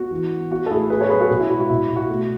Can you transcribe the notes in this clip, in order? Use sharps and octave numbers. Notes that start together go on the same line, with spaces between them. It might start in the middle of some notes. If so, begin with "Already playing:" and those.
Already playing: B3 F#4
E3
B3
B3 F#4
A4
A2 E4 G#4
B3 G#4 B4
A4 C#5
F#3 G#4 B4
F#4 A4
B2
E4
G#3 F#4
F#4
B2 E4
B2
F#4
A3